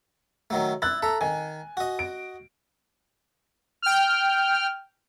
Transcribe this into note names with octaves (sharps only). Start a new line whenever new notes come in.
D#3 F#3 A3
E4 F#6 A6
A4 E5 A#5
D#3 G#5
F#4 D#5
D7
G5 F6